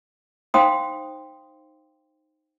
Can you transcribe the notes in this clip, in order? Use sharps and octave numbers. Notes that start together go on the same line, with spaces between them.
D#4 C5 F5 G5 C6 D#6